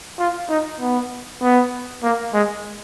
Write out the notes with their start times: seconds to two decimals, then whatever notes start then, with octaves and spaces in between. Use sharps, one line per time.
0.19 F4
0.49 D#4
0.80 B3
1.42 B3
2.03 A#3
2.33 G#3